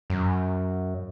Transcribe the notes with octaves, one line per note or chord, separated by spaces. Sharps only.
F#2